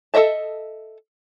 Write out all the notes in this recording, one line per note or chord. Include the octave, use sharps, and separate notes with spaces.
A4 A#4 D#5 E5 A5